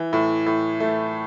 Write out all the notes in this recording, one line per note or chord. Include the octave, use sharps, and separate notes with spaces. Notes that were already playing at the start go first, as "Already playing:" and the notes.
Already playing: E3
A2
A2
A3